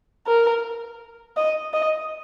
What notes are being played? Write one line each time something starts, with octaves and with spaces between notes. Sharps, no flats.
A#4
D#5
D#5